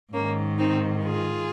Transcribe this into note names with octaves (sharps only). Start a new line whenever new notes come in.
G#2 D#3 A#3 C#4
C4 D#4
F4 G#4